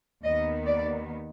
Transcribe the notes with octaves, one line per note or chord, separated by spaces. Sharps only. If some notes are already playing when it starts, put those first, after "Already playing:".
D#2 D#3 B3 D#5
D5